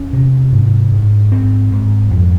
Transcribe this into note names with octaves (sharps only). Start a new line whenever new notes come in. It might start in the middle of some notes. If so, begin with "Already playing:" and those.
Already playing: E2 C#4
C3
G#2
G#2
G#2 C4
G#2
F2